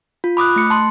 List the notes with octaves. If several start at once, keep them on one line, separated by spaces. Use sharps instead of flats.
F4
B5 D6 D#6 F#6
A3 C#7
A5 C6